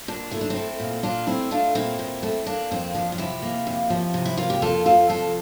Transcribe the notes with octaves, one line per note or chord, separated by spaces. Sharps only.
A#2 D4
A3 E4
D4
C4 E4
A3
A#2
A#2 D4 F4
A3 C4 E4
A3 D4 F4
A#2 C4 E4
A#2
A3
A#3 D4
F2 C4
F3 D4
F4
C3 E4 G4
A#3
F2
F3
C3
E4
A#3 F4
G4
F2 F4 A4
F3 F4 A4
C3 F4 A4